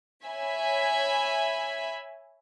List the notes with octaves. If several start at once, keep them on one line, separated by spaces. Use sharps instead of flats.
C#5 E5 G#5 B5